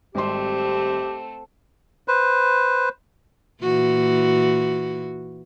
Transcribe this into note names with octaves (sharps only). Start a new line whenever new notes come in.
G#1 G3 A3 C4 G4 C6
B4 C5
A#2 E3 F#4